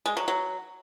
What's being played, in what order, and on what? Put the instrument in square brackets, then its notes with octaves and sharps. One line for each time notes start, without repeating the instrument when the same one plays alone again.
[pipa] G#3
F#3
F#3